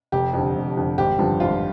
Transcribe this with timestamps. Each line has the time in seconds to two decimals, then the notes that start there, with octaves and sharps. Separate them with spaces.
0.12 F1 G4
0.34 F2 D3
0.55 F1
0.77 F2 D3
0.98 G#1 G4
1.19 G2 D3 F3
1.40 G#1 F4